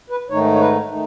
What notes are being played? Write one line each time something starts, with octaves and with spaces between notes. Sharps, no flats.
B4
G#2 D#3 A3 D#4 C#5
C#5
B4
D#3 A3 D#4